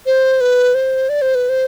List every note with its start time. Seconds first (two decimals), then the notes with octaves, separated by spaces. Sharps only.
0.06 C5
0.41 B4
0.75 C5
1.09 D5
1.22 C5
1.35 B4
1.49 C5